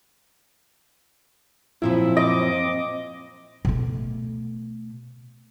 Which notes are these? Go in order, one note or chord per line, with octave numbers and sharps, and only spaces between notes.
F#2 A#2 F3 C4 E4
D#5 D6
B2 A3